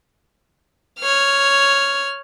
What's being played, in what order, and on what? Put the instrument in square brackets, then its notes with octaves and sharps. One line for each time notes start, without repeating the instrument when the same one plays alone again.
[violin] C#5 F6